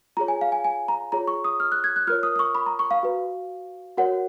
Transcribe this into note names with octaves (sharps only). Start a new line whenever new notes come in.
F4 G#4 C#5 A#5
G#5
F5
G#5
G#5
A#5
F4 G#4 C#5 A#5
C#6
D#6
F6
F#6
G#6
F#6
F4 A#4 C#5 F6
D#6
D#6
C#6
B5
A#5
C#6
F5
F#4 B4
F#4 A#4 C#5 F#5